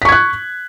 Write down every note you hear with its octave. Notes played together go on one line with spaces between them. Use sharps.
C#6 F#6 G#6 B6